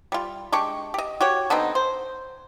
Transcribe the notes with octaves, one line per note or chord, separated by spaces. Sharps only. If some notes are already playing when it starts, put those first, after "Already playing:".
G3 F4
G#3 D4 G4 C#6
G4 D#5
F#4 G4 C#5
D3 B3 C4 D#4
C5